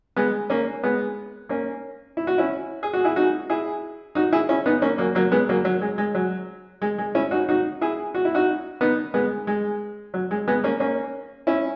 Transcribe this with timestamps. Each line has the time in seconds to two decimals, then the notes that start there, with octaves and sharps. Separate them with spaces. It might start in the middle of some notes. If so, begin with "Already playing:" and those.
0.16 G#3 B3
0.50 A#3 C#4
0.83 G#3 B3
1.49 A#3 C#4
2.17 E4
2.27 F#4
2.38 C#4 E4
2.83 G#4
2.93 F#4
3.04 E4 G#4
3.16 D#4 F#4
3.50 E4 G#4
4.15 D#4 F#4
4.32 E4 G#4
4.49 C#4 E4
4.66 B3 D#4
4.82 A#3 C#4
4.98 F#3 A#3
5.15 F#3 A#3
5.32 G#3 B3
5.49 F#3 A#3
5.65 F#3
5.81 G#3
5.98 G#3
6.15 F#3
6.82 G#3
6.98 G#3
7.15 C#4 E4
7.31 D#4 F#4
7.49 D#4 F#4
7.81 E4 G#4
8.14 F#4
8.25 E4
8.34 D#4 F#4
8.81 B3 D#4
9.14 G#3 B3
9.47 G#3
10.14 F#3
10.31 G#3
10.48 G#3 B3
10.64 A#3 C#4
10.80 A#3 C#4
11.47 C#4 E4